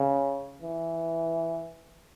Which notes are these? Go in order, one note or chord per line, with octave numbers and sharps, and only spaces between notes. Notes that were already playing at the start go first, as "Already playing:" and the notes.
Already playing: C#3
E3